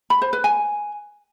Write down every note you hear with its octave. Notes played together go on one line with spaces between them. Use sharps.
B5
C5
B4
G#5